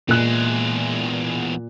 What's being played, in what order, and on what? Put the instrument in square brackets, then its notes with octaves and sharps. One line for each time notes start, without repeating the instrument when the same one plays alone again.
[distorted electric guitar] E2 G#3 [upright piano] A#2 F#6